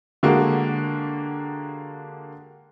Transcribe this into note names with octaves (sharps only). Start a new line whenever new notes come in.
D3 G#3 A#3 F#4 G4